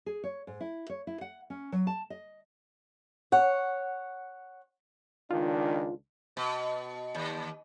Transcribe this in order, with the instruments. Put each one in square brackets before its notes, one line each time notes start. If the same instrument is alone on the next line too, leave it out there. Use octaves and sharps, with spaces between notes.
[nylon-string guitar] G#4
C#5
G#2
E4
C#5
E4
F#5
C#4
F#3
A5
D#5
[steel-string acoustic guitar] C#5 F#5
[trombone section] C#2 D#3 D4 [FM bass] F4
[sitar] B2
D#2